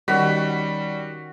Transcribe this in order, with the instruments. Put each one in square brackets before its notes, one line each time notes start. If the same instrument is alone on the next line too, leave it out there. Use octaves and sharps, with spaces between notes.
[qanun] D#3 C#4 [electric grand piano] G3 B6 [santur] F#4